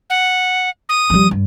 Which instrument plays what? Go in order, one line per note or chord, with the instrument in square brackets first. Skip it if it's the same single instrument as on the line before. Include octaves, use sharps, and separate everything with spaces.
[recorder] F#5
D#6
[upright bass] F3 G3
G2